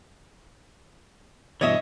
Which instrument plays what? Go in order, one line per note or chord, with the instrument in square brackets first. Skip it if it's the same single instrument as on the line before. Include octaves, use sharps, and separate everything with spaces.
[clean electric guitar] G2 B2 E3 [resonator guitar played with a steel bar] C#5 D#5 E5